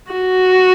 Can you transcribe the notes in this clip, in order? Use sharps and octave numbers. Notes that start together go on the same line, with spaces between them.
F#4